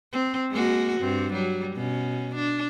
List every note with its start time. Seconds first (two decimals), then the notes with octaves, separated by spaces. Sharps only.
0.13 C4
0.51 G#3 A#3 F#4
1.00 G2 C4
1.33 F#3 G3
1.76 B2 C#4
2.35 D4